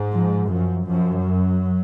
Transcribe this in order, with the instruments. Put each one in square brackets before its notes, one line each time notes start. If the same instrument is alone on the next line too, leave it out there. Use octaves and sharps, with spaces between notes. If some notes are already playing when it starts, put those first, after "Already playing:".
Already playing: [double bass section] G#2
[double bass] F3
[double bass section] F#2 [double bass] F3
[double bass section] F#2 [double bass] F3
[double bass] F#3